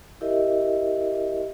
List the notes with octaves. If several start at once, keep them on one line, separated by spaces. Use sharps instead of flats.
E4 G4 A#4 D#5 E5